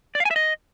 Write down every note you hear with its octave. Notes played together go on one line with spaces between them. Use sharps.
D5
F5
G#5
E5
D#5